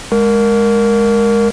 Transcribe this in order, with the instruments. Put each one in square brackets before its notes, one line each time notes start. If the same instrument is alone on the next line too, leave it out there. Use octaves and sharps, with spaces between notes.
[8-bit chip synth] G#3 A#4